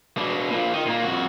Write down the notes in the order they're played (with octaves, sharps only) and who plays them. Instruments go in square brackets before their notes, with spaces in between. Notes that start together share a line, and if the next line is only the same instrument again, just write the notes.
[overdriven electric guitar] B2 D4
A#2 F3
D#3
A#2 A#3
F2 F#4